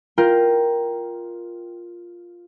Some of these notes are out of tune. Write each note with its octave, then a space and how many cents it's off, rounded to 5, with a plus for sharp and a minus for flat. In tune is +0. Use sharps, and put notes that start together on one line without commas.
F4 +0 A#4 +10 G5 +0